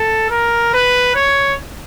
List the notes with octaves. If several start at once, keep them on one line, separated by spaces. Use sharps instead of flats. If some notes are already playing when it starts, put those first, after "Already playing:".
Already playing: A4
A#4
B4
C#5